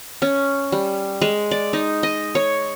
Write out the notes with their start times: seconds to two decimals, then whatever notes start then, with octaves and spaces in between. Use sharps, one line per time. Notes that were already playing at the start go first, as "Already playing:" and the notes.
0.22 C#4
0.72 G3
1.22 G#3
1.51 D5
1.73 D#4
2.03 D#5
2.35 C#5